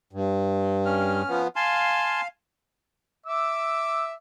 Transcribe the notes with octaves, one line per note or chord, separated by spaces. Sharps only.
G2
C#4 F6
F3 B3
F5 G#5 A5 C6
E5 D6 E6